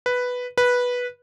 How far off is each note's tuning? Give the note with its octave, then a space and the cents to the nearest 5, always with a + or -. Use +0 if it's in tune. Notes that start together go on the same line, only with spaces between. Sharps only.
B4 +0
B4 -10